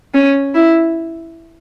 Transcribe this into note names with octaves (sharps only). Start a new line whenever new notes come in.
C#4
E4